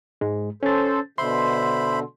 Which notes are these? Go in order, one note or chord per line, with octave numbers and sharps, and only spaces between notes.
G#2 G#3
C#4 A4 C5 A6
B2 D3 C5 E5 B5 C6